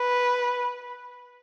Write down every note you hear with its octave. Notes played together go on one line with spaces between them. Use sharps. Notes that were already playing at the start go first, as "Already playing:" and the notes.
Already playing: B4